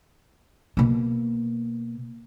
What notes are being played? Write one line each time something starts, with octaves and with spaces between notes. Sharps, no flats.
B2 A#3